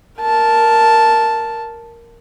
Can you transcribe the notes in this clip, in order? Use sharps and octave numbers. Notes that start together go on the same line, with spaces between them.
A#4 A5